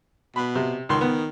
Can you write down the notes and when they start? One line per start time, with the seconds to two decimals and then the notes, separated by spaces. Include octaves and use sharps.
0.36 B2 B5
0.55 C3
0.89 C#2 D#3 C6
1.01 B3